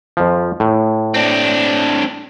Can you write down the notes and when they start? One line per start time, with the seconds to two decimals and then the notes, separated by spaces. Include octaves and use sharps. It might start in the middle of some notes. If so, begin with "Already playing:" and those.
0.17 F2 F3
0.60 A2
1.14 C4 D4